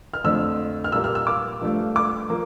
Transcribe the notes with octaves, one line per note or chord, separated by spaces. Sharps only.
F6
F2 D3 A3 E6
F6
A#2 G3 A#3 E6
F6
E6
D6
G2 F3 A3
D6
F3 A#3